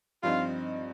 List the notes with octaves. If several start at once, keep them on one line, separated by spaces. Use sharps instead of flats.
G2 F3 C4 D#4 F4